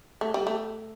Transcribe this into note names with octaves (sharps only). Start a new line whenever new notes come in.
A3
G3
A3